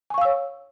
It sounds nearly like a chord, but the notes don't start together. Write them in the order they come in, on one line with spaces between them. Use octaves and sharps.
G#5 C#6 F5 E6 C#5